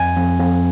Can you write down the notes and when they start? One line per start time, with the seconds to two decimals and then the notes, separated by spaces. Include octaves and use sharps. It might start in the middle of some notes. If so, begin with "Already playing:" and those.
Already playing: F2 G#5
0.16 F2
0.39 F2